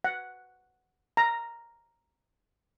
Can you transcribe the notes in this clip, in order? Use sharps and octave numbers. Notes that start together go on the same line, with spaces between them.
F#5
A#5